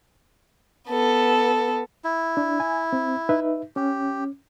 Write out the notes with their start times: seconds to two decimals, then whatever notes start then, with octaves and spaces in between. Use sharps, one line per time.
0.89 B3 A4
2.04 E4
2.37 D4
2.60 G#5
2.93 C4
3.29 D#4 B4 E5
3.76 C#4 G4